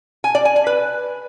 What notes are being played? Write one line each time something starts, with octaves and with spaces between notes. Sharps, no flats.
G#5
D5
G#5
G#5
B4